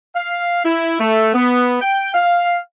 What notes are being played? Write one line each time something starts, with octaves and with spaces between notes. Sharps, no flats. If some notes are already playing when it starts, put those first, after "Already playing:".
F5
E4
A3
B3
G5
F5